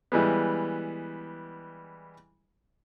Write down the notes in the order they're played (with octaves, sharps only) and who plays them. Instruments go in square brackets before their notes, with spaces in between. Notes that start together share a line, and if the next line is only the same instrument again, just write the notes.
[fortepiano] E3 G3 G#3 B3